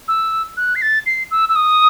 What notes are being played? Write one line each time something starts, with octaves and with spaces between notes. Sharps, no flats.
E6
F#6
C7
A6
C7
E6
E6
D#6